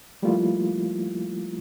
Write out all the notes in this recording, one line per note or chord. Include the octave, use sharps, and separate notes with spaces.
F3 G3 A3 A#3 E4 F4